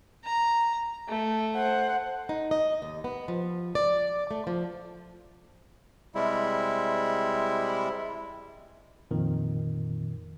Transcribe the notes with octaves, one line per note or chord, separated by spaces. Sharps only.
A#5
A3
C5 F#5
D#4
D#5
D#2
B3
F3
D5
A3
F3
C3 G3 G#3 E4
F2 A#2 D#3